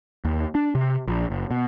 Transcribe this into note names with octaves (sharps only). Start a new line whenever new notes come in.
D#2
D4
C3
A#1
F#1
B2